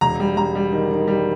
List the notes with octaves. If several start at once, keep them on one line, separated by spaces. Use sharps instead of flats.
E1 A#5
G3
G3 A#5
G3
D#3
D#3
G3